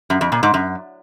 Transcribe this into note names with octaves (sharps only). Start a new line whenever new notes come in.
F#2
F2
A#2
G#2
F#2